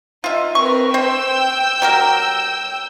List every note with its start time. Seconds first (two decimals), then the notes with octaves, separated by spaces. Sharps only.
0.24 D#4 F4 E5
0.55 C4 A#4 B4 C#6
0.94 C5 G5 E6 G6
1.82 F#3 G4 A#4